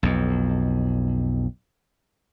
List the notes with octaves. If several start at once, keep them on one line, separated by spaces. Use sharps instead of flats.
B1 F2